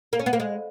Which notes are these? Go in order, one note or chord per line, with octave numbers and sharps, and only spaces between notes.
A#3
C#4
B3
A#3
G#3